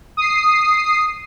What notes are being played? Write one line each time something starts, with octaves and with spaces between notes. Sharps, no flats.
D#6 C7